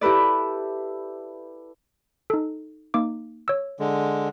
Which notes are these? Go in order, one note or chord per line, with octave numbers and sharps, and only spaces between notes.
E4 G4 A4 B4 D5
D#4 A4
A#3 D#4 D6
C#5 E6
D3 G#3